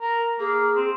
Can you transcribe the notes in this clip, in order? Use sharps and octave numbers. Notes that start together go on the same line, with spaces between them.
A#4
A#3 G#4
C4